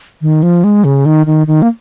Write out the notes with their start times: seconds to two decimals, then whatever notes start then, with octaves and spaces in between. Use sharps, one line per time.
0.22 D#3
0.43 F3
0.64 G#3
0.84 C#3
1.06 D#3
1.26 D#3
1.47 D#3
1.62 A#3